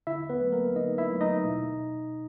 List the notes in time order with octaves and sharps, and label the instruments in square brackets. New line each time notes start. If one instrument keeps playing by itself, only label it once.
[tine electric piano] D3 E4 E5
B3 B4
F#3 A3
A#3 A#4
D3 D#4 D#5
E4 E5
F#3 A3
D#4 D#5
B2